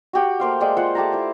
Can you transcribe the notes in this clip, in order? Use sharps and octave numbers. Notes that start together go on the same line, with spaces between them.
F#4 G4 F#5
A3 A#3 C5 F5
G#3 D5 G5
F4 C5 F#5
A3 G4 A5 A#5
E4 C5